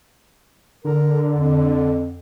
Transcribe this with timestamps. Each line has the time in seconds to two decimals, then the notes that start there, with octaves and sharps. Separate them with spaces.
0.85 D3 A#4
1.36 F2